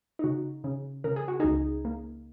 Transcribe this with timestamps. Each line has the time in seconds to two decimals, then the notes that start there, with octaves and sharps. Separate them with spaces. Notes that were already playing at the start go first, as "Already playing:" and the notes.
0.19 D#4
0.24 C#3 F#4
0.64 C#3
1.04 C#3 A#4
1.16 G#4
1.28 F#4
1.40 C#2 D#4 G#4
1.85 A#3